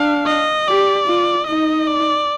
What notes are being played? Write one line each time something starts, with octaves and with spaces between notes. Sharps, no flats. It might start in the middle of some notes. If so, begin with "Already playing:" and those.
Already playing: D4 F5
D#5
G4 D5
F4
D#4 D#5
D5